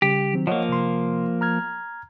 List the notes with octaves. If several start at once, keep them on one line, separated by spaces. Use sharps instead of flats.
C#3 G3 G4
D#3 F#3 C4
F3 A#3 C#5 D#5 F#5
C3 C6
A#5 F6 G#6